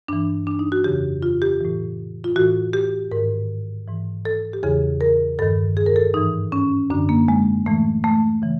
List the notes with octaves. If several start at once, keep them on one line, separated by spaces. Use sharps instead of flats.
G2 E3 D4
D4
D#4
F#4
F2 C#3 E3 G4
F4
G4
A2 E3
F4
A2 E3 F#4
G4
G#2 D#3 A#4
G#2 E3
A4
G4
E2 C#3 E3 G#4
A#4
G2 D#3 A4
G#4
A#4
A4
G#2 E3 D#4
C#4
F#2 D3 D4
A#3
G#3
A2 E3 A3
A3
C#3 E3